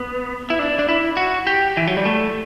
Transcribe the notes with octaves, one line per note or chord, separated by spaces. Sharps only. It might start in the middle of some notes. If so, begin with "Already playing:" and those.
Already playing: B3
E4
D4
D4
E4
F#4
G4
E3
F#3
G3
A3